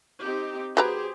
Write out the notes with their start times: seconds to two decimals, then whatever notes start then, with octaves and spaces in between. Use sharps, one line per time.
0.24 C4 D#4 G4
0.77 F#3 G4 G#4 B4 C5 A#5